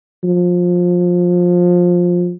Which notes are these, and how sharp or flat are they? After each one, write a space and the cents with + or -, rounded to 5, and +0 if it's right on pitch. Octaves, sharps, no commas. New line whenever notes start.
F3 +20